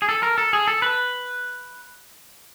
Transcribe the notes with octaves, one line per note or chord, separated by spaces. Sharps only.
G#4
A4
A#4
A4
G#4
A4
B4